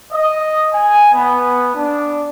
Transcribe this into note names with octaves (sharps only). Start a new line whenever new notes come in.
D#5
G#5
B3
D4